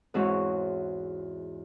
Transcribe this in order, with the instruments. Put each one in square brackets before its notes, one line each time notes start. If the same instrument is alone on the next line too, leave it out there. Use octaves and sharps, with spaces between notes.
[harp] E2 G#2 C4 E4 F#4 C#5